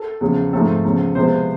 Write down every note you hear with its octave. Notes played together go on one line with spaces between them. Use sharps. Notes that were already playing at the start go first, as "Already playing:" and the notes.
Already playing: A4
E2 C#3 F3
G#2 F3 A3 C4 A4
E2 C#3 F3
C3 F3 G#3 B3 C5